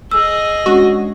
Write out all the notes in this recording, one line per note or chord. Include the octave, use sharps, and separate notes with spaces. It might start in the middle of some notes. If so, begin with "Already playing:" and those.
G#4 D#5 E6
G#3 C#4 D4 F#4